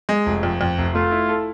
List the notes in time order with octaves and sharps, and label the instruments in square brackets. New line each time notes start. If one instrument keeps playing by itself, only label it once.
[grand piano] G#3
F1
F2
F2
F1
[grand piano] A3 [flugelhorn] F4
[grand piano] E4
A4